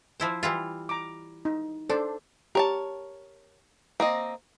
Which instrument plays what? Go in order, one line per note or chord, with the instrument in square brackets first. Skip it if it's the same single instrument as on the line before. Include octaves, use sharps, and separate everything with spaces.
[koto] F3 E4 C5
E3 G3 F4
[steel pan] A#5 D6
D#4
[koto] D4 [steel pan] A4 C5 D5
[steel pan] G4 [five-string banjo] A#4 C#5 A5
[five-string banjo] A#3 C4 D#5